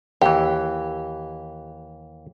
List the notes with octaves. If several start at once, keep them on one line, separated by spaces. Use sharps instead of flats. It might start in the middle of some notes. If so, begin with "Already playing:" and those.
D#2 E3 G4